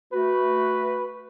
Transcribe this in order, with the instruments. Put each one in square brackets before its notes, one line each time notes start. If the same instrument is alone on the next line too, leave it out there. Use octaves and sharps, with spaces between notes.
[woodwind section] A3 F#4 [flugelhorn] B4